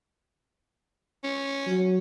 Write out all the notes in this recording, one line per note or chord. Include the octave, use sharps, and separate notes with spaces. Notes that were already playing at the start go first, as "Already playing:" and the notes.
C#4
F#3